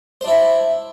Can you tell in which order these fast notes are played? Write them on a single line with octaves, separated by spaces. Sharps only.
C5 D4 E4